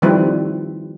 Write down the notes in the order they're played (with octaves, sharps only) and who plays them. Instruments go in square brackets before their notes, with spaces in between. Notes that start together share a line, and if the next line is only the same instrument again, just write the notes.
[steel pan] D#3 F3 G3 C4 E4 B4